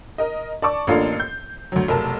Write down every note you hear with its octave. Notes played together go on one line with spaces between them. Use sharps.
A#4 D#5
D5 A5 C#6 D6
A1 A#3 D4 F4 A4 C7
G6
D2 F#3
F1 B1 A#4 A5